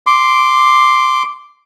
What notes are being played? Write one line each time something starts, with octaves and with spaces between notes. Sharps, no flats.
C6 D6